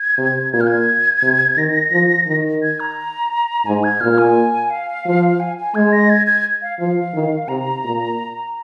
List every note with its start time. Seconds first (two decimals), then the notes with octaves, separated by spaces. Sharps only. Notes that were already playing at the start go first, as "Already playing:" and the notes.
Already playing: G#6
0.18 C3
0.53 A#2 G#6
0.61 F6
0.67 G#6
1.22 C3
1.57 D#3 A#6
1.92 F3
2.27 D#3
2.63 G#6
2.80 A#5
3.66 G#2 G#5
3.83 G#6
4.01 A#2 F6
4.18 G#5
4.70 F5
5.06 F3
5.40 G#5
5.58 G#5
5.75 G#3 G#6
5.92 A#6
6.10 G#6
6.27 G#6
6.62 F5
6.79 F3 F5
7.14 D#3
7.48 C3 A#5
7.84 A#2